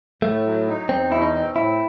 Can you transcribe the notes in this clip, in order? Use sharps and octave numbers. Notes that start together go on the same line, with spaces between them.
A2 A3
F#3
D#4
E2 C4
B2 E4
D#4
C4
A2 E4